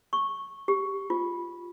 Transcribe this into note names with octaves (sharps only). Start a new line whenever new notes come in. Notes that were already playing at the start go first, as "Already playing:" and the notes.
C#6
G4
F4